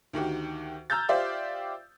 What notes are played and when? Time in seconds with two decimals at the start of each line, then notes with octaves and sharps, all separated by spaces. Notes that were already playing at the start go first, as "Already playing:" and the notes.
0.13 D2 D#3 F#4 G4
0.90 A#5 E6 F6 G6 A6
1.09 F4 G4 C5 D5 E5 F5